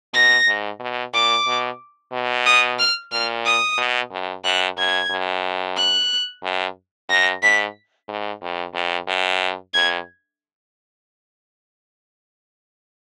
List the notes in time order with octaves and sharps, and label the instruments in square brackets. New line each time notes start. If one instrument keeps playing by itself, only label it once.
[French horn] B2 [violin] A#6
[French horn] G#2
B2
[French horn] A#2 [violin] D6
[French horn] B2
B2
[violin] D#6
F6
[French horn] A#2 [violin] F6
[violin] D#6
[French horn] B2
F#2
[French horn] F#2 [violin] F#6
[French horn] F#2 [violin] G#6
[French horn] F#2
[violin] F#6
[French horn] F#2
[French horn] F#2 [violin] A#6
[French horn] G#2 [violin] B6
[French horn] G#2
F2
F2
F#2
[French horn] F2 [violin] G#6